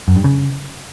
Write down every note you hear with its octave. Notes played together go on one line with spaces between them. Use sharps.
F#2
G2
C#3